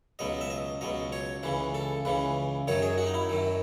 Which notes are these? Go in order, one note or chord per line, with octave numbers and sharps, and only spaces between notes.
C#2 B2 F#3 D#5
E5
D#5
C#2 B2 F#3 D#5
C#5
C#2 C#3 E3 B4
A4
C#2 C#3 E3 B4
F#2 D#3 F#3 C#5
G#4
F#4
D#4
E4
F#2 D#3 F#3